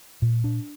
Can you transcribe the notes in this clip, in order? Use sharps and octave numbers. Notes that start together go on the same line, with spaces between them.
A#2
D4